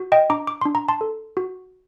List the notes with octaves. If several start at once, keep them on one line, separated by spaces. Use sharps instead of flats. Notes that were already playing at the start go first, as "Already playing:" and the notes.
Already playing: F#4
D#5 G5
D4 A#5 D6
D6
D4 C6
A#5
A5 C6
A4
F#4